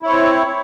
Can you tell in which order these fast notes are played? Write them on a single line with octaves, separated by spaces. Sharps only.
E4 C#5 C4